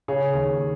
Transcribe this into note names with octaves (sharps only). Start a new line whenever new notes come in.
C#3 G#4 C#5
D#2